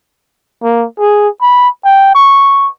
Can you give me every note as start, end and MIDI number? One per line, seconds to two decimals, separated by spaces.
0.63 0.85 58
0.99 1.28 68
1.42 1.69 83
1.85 2.12 79
2.14 2.68 85